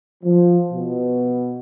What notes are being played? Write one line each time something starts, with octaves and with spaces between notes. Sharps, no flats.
F3
B2